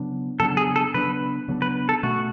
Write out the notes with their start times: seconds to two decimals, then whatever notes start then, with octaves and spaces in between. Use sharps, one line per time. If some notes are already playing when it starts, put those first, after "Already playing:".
Already playing: C#3 F#3 B3 D4
0.40 C#3 F#3 B3 D4 A4
0.57 G#4
0.76 A4
0.94 C#3 F#3 B3 D4 B4
1.48 C#3 F#3 B3 D4
1.62 B4
1.89 A4
2.03 B2 A3 C#4 F#4